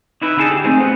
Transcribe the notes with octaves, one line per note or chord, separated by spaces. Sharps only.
D#4 E4 B4
D3 D#4 E4 G#4 A4 A5
G4
A3 C4 D#4 G#4
B3